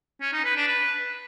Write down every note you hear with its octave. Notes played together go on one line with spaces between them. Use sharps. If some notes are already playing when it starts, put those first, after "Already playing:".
C#4
D#4
B4
D4
B4